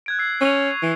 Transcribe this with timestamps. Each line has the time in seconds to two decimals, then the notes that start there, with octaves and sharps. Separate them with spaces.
0.06 F#6 G#6 D7
0.19 E6 C7
0.41 C#4 C#6 F7
0.82 E3